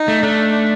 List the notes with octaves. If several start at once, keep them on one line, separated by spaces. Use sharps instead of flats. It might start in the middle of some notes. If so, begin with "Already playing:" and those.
Already playing: D#4
A3
A3 D4